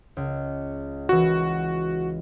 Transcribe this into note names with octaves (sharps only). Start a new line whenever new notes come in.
C#2
E3 F#4 E7